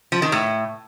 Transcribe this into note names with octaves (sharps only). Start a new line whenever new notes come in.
F3
D#3
A2